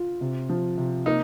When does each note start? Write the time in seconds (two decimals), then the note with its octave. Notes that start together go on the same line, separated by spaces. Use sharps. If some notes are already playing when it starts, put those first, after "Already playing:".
Already playing: F4
0.21 C3
0.49 F3
0.77 C3
1.06 A#3 D#4